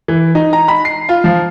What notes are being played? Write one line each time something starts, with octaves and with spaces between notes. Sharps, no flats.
E3
D#4
A#5
B5
C7
F4
F3